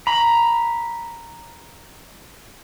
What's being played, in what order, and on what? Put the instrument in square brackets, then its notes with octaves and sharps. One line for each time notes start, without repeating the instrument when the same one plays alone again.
[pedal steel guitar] A#5 B5